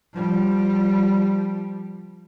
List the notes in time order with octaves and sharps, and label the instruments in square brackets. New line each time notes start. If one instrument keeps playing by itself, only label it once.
[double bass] F3 G3